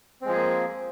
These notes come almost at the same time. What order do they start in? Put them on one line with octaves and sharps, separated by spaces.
C4 G#3 F3 G#4 A#3